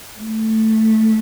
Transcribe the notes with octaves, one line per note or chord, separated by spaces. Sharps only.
A3